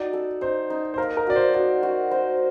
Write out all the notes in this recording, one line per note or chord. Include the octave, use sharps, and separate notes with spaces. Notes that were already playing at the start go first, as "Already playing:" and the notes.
Already playing: D#4 F#4 D5
A4
D#4 C5
D#4
C5
A#3 A#4
A#4
F#4 D5
C5
F#4 D5
F#4
C5